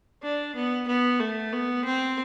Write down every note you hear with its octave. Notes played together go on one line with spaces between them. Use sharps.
D4
B3
B3
A3
B3
C4